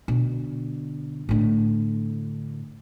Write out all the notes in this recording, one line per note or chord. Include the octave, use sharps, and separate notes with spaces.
B2 D3
A2 D3